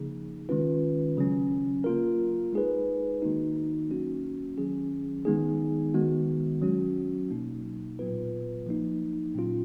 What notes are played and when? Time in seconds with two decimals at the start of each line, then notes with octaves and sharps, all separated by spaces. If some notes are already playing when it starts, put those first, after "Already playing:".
Already playing: C#3 F3 A#3 D#4 G#4
0.49 D#3 G#3 C#4 F4 B4
1.17 C#3 F#3 C#4
1.84 A#3 F4 A#4
2.53 G#3 D#4 G#4 B4
3.22 D#3 A#3 D#4 F#4
3.89 F#3 A#3 C#4 F#4
4.58 D#3 F#3 C#4 G#4
5.25 D#3 G#3 B3 D#4 G#4
5.94 D#3 G#3 B3 F#4
6.62 F#3 C#4 F#4
7.30 B2 A#3 D#4
7.99 A#2 F#3 B3 F4 B4
8.66 F3 A#3 D#4
9.35 A#2 F#3 C#4 F4